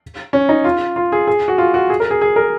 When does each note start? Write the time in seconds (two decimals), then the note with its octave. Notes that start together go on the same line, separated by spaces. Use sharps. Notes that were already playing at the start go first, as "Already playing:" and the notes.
0.33 C#4
0.49 D#4
0.64 F4
0.96 F4
1.12 G#4
1.27 G#4
1.48 F#4
1.58 F4
1.74 F#4
1.90 G#4
2.00 A#4
2.11 G#4
2.21 G#4
2.36 A#4